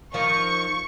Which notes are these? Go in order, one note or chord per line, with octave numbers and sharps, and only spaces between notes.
D#3 F3 C#6